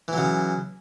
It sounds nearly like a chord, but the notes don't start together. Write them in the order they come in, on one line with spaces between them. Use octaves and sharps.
E3 F#3 C#3